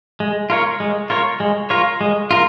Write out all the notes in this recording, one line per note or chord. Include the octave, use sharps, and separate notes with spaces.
G#3
F4 A#4 C#5
G#3
F4 A#4 C#5
G#3
F4 A#4 C#5
G#3
F4 A#4